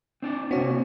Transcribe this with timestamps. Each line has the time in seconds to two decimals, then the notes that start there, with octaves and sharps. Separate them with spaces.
0.22 C4 D4 D5
0.51 C3 A#3 C4 F#4 C#5